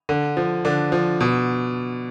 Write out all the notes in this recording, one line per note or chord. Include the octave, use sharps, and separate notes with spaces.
D3
F3
D3 D4
F3
B2